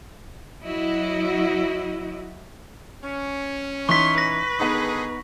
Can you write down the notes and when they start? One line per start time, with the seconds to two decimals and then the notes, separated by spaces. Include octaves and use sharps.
0.64 F#3 E4 F#4 D#5
3.04 C#4
3.89 E3 D#4 C6 C#6 B6
4.18 B4 A#6
4.59 D3 D#3 B3 D#4 G#4